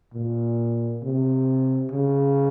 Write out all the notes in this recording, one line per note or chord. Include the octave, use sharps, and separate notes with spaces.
A#2
C3
C#3